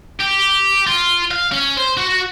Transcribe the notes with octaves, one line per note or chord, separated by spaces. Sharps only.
G4
F4
F5
C#4
C5
F#4